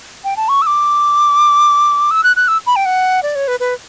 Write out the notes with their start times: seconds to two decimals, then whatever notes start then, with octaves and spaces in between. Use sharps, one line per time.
0.24 G5
0.37 A5
0.49 C#6
0.62 E6
0.67 D6
2.11 E6
2.24 F#6
2.36 F#6
2.48 E6
2.66 B5
2.76 G5
2.85 F#5
3.23 D5
3.35 C#5
3.48 B4
3.60 B4